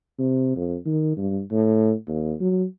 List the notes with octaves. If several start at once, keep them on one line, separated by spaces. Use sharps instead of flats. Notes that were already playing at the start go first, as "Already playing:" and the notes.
C3
F2
D#3
G2
A2
D#2
F#3